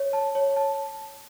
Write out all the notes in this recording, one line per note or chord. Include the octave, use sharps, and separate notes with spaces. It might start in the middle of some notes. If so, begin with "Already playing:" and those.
Already playing: C#5
A5
C#5
A5